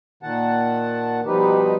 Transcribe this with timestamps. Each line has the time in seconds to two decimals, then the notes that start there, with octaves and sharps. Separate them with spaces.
0.23 A#2 D#3 F#5 A5
1.26 B2 F3 G3 D#4 G4 B4